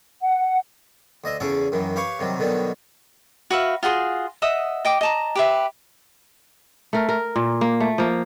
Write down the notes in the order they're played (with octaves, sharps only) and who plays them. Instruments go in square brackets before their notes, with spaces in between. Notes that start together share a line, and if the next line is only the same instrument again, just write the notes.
[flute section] F#5
[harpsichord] D2 D#5 E5
E2 C#3 C#4 G#4 A4 D6
F#2 D#3 E3
G4 B4 C#5 F5 C#6
C3 D#3 F#3 G3
B2 D3 D#3 F#3 G3 B3
[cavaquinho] F#4 B4 E5 F5
F4 F#4 G#4 C6
D#5 E5 F#5 D#6
D#5 G5 D6
D#5 A5 A#5
G4 B4 E5
[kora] A3 A#4
A#4
A#2
A#3
A3
F3 A#3